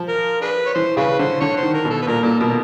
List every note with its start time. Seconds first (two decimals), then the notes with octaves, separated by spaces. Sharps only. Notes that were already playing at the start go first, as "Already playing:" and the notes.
Already playing: F3
0.09 A#4
0.41 D4 G#4 B4
0.66 C#5
0.74 E3 C5
0.97 C#3 D4 G#4 B4
1.19 D3 C5
1.40 D3 C#5
1.57 C5
1.63 D#3
1.74 A#4
1.85 B2
1.90 A4
2.02 B4
2.07 A#2 A#4
2.23 A#2 A4
2.40 B2 A#4